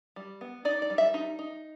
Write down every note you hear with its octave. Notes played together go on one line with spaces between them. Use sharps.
G3
B3
D#4 D5
D5
G3
E5
D#4
D#4